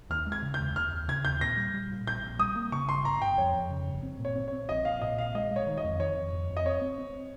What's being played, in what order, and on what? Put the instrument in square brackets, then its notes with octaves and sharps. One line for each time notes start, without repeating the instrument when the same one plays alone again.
[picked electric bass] D#2 [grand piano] F6
[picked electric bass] G#3
[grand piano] G#6
[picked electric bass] C#3
[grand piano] G6
[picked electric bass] D#2
[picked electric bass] D#2 [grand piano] F6
[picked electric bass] D#2
[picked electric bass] C#3 [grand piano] G#6
[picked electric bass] D#2 [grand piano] G6
[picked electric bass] A#2 [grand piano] A#6
[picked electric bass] G3
G3
A#2
[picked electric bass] A#1 [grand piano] G6
[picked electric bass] A#1
[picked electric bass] G3 [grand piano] D#6
[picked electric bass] A#3
[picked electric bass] C#3 [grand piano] C#6
[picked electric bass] G1 [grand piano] C6
[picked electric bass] G1 [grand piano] A#5
[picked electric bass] G1 [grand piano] G5
[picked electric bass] F2 [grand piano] C#5
[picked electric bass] F2
C#3
G1
C4
[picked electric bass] A#2 [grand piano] C#5
[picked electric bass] C4
[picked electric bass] C4 [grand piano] C#5
[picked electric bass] A#1 [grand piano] D#5
[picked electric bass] A#1 [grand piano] F5
[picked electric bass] A#2 [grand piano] D#5
[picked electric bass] A#1 [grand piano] F5
[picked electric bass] G#3 [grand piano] D#5
[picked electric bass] G#3 [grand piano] C#5
[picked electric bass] D#3
[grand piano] D#5
[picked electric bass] F2
[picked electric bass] D#3 [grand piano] C#5
[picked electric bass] F2
F2
F2
[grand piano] D#5
[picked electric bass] C4 [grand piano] C#5
[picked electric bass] C4
C4